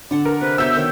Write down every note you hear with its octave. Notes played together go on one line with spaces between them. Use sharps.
D3 D5 F#5 A5
A#4
C3 B4
B2 C#5 E5 E6 G6
D#3 C#5 G5